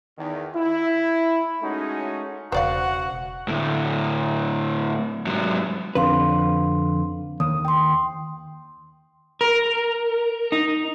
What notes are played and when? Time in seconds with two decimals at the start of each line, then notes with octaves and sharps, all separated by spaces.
0.18 E2 D#3
0.55 E4
1.62 G#3 A3 C#4 D#4 F#4
2.52 E1 C#3 F#4 C5 D5 F5 F#5
3.48 D2 A2
5.27 G#2 F#3
5.95 F2 D3 C4 B4 F5 C6
7.40 D#2 D#6
7.65 G5 C6
9.41 A#4
10.52 D#4